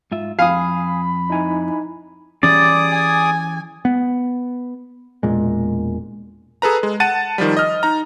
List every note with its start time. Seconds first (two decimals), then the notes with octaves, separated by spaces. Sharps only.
0.12 G#2 F4 E5
0.39 F2 F5 G#5 B5 D#6
1.30 D#4 E4 G#5
2.43 E3 G3 C#4 G#4 D5 D6 D#6
2.91 G#5
3.85 B3
5.23 E1 A#2 G#3
6.62 G#4 A4 B4 A#5
6.83 G#3
7.00 F#5 A5 A6 D#7
7.38 D#3 F3 G3
7.57 D#5 F6
7.83 D#4 A#5